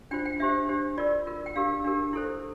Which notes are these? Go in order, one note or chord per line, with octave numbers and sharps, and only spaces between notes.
D4 F4 C5 G5
G5
D4 G4 C5 E5
D4 G4 C5
F4 A#4 D5
F4 A#4
G5
D4 G4 A#4 F5
D4 G4 A#4
E4 A4 C5